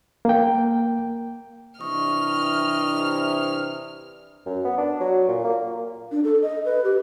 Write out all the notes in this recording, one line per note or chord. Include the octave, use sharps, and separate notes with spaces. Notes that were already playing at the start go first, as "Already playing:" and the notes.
A#3 G5
C3 E3 D4 D#5 C#6 F6
F#2
B3
D4
F#3
A#2
A#3
D4
A4
D#5
B4
G4